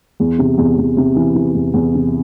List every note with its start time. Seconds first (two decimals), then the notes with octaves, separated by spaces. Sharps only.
0.20 E2
0.39 C3
0.58 E2
0.78 E2
0.97 C3
1.16 E3
1.35 E3
1.55 E2
1.74 E2
1.94 C3